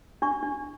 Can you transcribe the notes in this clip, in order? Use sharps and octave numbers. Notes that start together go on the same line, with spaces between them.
D4 C#6
D4